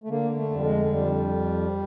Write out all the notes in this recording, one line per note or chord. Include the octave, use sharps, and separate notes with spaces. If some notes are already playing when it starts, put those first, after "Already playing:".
A3
D3 A#3
A3
F2
G3
G#3
G#3
F2 G3